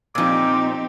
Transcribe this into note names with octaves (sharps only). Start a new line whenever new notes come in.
A#2 F3 C4 D#4 G4 D6